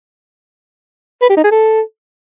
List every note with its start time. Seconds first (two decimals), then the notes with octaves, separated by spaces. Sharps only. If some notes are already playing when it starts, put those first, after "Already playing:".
1.22 B4
1.30 G4
1.37 D#4
1.44 G#4
1.51 A4